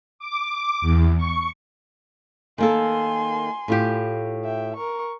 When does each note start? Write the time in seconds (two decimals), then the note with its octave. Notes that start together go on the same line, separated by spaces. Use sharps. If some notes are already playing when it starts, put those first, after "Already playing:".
0.19 D6
0.81 E2
1.17 C#6
2.58 D#3 A#3 A4 G#5 C6
3.68 A2 F4 G4
4.44 E5 G5
4.76 A#4 C#6